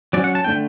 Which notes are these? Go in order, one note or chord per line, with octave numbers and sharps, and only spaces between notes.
F#3 C#4 D5
F#5
A5
D3 A3 C#4 G5